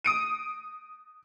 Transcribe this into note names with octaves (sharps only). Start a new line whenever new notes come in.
D#6 D7 D#7